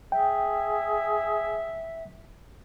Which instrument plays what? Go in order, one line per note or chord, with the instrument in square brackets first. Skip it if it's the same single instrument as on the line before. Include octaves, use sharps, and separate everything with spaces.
[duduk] G#4 [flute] E5 [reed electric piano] G5